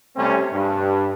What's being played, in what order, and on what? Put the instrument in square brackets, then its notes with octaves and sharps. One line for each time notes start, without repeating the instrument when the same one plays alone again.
[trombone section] C3 G3 A3 C4 C#4
G2